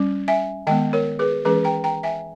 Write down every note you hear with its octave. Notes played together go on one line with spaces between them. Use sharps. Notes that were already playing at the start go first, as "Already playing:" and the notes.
Already playing: G3 C#4
E5 G#5
D#3 G#3 B3 D#5 G5
A#4 C#5
G#4 B4
E3 G#3 C#4 G#4 B4
G5 A#5
G5 A#5
E5 G#5